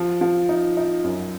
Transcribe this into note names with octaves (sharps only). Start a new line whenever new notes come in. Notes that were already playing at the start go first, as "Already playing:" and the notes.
Already playing: F3
F3
D#4
D#4
F#2